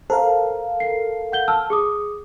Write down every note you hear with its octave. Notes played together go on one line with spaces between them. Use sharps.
A4 A#4 C5 F5
C7
F#5 G6 G7
A5 E6 F6
G#4 D6 D#6